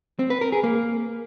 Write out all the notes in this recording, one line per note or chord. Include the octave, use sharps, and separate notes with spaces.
C4
B4
A#4
G#4
A#3